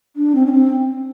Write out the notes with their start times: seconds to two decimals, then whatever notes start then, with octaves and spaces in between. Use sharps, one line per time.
0.16 D4
0.35 C4
0.46 C#4
0.53 C4